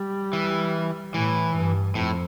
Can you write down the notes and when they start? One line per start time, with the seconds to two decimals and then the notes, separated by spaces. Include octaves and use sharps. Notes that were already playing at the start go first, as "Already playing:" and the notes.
Already playing: G3
0.33 E3
1.14 A2 E3
1.55 G2
1.95 F2 A2